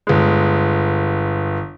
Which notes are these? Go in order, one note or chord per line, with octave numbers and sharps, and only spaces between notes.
G1 G#3